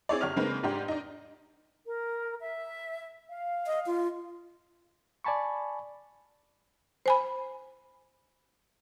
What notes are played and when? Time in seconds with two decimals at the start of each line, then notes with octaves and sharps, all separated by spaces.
0.09 C4 E4 G#4 C#5 D5
0.21 G1 G4 C#5 F6
0.36 C#3 G#3 A#3 C4 D#4 B4
0.63 G#2 D4 G4 C6
0.88 D4 D#4
1.86 A#4
2.40 E5
3.30 F5
3.67 D#5
3.86 F4
5.24 D5 G#5 A5 B5 C#6
7.06 C5 G#5 B5